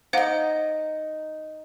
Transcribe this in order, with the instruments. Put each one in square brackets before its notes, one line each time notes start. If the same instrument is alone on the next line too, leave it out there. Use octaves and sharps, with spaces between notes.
[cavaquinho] D#4 D#5 [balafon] C5 F5 F#5